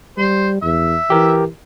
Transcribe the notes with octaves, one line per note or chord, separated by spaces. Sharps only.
G3 C5
E2 E5
E3 G4 A#4